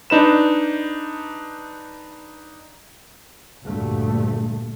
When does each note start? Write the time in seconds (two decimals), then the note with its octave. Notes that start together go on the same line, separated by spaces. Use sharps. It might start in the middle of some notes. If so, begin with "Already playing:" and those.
0.10 D4 D#4 B4 E7
3.64 D2 G2 A#2 A3